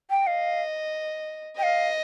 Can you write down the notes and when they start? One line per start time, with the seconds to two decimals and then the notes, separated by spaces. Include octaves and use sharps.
0.10 G5
0.27 D#5 F5
1.58 D#5 G5
1.63 F5